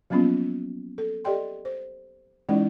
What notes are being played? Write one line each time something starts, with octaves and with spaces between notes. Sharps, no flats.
F3 F#3 A#3 B3 C#4 F4
A4
G4 A4 D5 D#5 G5 C6
C5
E3 G#3 C#4 D#4 E4 D5